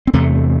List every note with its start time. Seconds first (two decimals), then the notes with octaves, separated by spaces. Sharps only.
0.07 C4
0.13 E2 C3 A3